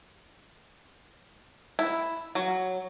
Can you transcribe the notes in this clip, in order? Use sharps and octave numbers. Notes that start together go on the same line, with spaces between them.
E4
F#3